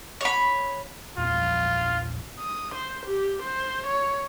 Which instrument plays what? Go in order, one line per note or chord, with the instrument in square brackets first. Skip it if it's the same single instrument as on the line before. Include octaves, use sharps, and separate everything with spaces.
[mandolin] C#5 B5
[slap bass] A#1 E2 F3 [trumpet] F4
[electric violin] D#6
C5
G4
C5
C#5